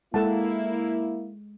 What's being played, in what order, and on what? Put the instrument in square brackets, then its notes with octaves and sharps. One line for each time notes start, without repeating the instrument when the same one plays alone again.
[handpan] G#3 [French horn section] A#3 E4 [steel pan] A4 F#5 A5